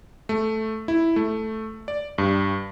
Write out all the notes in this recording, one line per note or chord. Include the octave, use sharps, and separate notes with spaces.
A3
E4
A3
D5
G2